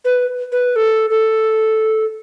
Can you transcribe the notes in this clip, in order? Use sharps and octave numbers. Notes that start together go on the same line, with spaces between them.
B4
B4
A4
A4